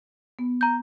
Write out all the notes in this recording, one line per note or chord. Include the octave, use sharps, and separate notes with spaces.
B3
A#5 G6